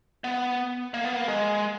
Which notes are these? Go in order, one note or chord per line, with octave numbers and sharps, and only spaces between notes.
B3
A#3
B3
A#3
G#3